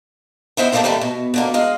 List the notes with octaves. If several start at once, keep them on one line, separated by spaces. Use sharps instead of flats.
B3 E4 C5 D#5 G5
G2 C3 A3 A#3 C4 D#4
D#2 D#3 G3 A3
B2
B2 D3 A#3
G#3 D#5 F5